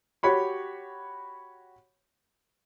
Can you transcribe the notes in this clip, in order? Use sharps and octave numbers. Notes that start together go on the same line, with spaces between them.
F#4 G4 C#5 B5 C#6